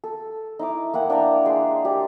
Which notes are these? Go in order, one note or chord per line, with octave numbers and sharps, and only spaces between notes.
A4
D#4 E4 D6
A#3 E4 F#5 G5
D4 D5 A#5
G#3 C6
G4 D5